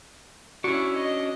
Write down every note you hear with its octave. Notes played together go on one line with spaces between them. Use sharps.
C#4 D4 E4 F#4 C#6
D#5